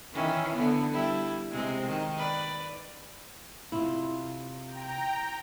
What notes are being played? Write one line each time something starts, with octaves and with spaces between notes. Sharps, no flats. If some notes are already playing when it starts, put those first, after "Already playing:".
D#3 E3 C#4
D3 B3
G3 E4
C3 G#3 C4
D#3
B4 D5
C3 E4 F4
G5 A#5